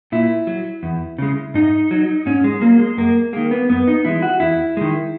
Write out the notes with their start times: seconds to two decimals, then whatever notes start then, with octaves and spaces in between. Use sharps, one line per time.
0.12 A#2 E4
0.47 F#3
0.83 E2
1.19 C#3 G#3
1.54 G#2 D#4
1.91 F#3
2.26 G#2 C#4
2.44 G#3
2.61 F#3 A#3
2.79 G#3
2.97 F#2 A#3
3.33 D#3 G#3 A#3
3.51 B3
3.69 F#2 B3
3.88 D#4
4.05 E3 G#3 E4
4.22 F#4
4.40 E2 E4
4.77 D#3 G#3